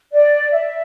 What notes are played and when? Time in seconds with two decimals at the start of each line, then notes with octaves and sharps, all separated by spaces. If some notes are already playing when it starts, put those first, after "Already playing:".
0.12 D5
0.51 E5